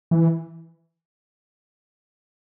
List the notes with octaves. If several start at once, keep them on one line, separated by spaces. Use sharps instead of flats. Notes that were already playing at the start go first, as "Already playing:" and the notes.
E3